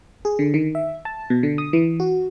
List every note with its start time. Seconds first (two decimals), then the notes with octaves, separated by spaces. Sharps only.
0.25 G#4
0.39 D3
0.54 D#3
0.75 E5
1.05 A5
1.30 B2
1.43 D3
1.58 D#6
1.73 E3
2.00 F#4